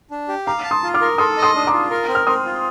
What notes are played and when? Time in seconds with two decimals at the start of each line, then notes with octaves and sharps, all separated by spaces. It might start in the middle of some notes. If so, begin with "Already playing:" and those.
0.11 D4
0.28 G4
0.46 F5 A#5 D6
0.64 A5
0.71 C6 D#6
0.83 F4
0.94 D6 F6
1.01 A#4
1.18 A4 C6 D#6
1.37 D#5
1.43 C6 D#6
1.55 D4
1.67 A#5 D6
1.73 F4
1.91 A#4
2.09 C4
2.15 F6
2.27 C4 C6 D#6
2.45 F4